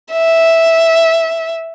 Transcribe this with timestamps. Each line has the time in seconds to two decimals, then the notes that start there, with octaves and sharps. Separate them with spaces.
0.12 E5